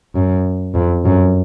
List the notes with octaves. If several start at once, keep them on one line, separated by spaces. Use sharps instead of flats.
F#2
F2
F#2